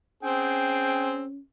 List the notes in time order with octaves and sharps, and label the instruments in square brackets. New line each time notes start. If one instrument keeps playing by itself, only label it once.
[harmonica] C4 G#4 [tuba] C#4 [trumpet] G5